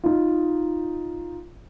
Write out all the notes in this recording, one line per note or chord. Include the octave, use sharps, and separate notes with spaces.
D#4 F4